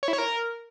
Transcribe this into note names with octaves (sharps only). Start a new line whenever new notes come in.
C#5
E4
C#5
A#4